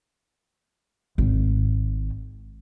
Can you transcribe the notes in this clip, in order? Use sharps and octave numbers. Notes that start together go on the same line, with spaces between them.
G#1